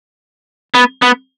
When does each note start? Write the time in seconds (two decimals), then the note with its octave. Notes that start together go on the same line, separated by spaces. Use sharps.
0.75 B3
1.02 B3